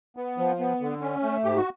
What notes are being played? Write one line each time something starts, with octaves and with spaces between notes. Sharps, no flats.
B3
F3
B3
D3
C#4
A3
G#2 G4
F#4